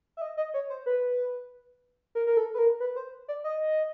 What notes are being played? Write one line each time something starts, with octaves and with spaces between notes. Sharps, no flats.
E5
D#5
D#5
C#5
C5
B4
A#4
A#4
A4
B4
A#4
B4
C5
D5
D#5